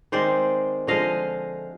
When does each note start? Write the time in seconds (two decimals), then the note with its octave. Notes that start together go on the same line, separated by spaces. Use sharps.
0.12 D#3 G#3 C4 C5 D5
0.87 D3 F3 G#3 D#5 F5